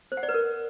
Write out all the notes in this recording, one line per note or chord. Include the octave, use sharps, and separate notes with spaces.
C5
F#5
D5
B4
A#4